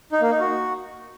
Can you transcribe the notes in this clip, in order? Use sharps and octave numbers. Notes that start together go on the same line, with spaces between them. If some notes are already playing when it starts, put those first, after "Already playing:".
D#4
A#3
D#4
F#4